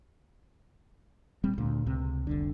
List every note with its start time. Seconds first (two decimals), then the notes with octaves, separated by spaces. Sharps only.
1.44 D#1 G3 C4
1.58 D2 A#2
1.86 C#2 C3
2.27 F1 C2 D3